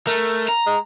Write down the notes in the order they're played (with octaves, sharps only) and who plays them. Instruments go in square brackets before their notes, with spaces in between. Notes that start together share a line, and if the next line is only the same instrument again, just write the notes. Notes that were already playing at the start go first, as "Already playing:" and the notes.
[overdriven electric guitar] A3 [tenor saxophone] A#4
[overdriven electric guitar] A#5
[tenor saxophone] G#3